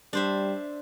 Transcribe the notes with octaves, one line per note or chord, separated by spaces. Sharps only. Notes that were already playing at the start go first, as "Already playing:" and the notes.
G3 D4 C5 E5